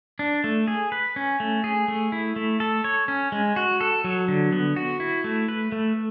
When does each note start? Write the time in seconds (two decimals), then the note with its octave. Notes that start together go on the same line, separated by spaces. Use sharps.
0.19 D4
0.44 A3
0.68 G#4
0.92 B4
1.16 C#4
1.40 A3
1.64 G#4
1.88 A3
2.12 E4
2.36 A3
2.60 A4
2.84 C#5
3.08 C#4
3.32 G#3
3.56 F#4
3.81 A4
4.04 F#3
4.28 D3
4.52 B3
4.76 F#4
5.00 E4
5.24 A3
5.48 B4
5.72 A3